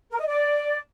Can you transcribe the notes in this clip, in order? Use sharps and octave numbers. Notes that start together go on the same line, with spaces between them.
A#4
D#5
D5